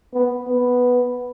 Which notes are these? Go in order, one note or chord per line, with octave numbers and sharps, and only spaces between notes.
B3
B3